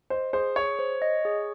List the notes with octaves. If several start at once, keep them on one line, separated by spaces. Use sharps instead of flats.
C5 D#5
G#4 C5
G#4 C#5
C5
D#5
G#4